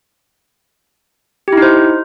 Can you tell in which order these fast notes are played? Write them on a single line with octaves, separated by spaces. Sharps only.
G4 E4 D#4 C5